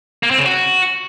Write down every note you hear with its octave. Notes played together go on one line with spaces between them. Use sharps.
A#3
C4
C#3
F#4